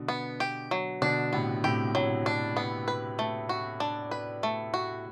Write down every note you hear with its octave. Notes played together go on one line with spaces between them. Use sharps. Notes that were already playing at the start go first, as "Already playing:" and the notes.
Already playing: B2 D3
B3
G4
F#3
B2 D3 D4
A2 C3 B3
A2 C3 G4
A2 F#3
D4
B3
B4
A3
F#4
D4
B4
A3
F#4